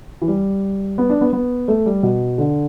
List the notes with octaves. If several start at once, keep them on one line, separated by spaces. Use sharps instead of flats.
E3
G3
B3
D4
B3
B3
A3
G3
B2
D3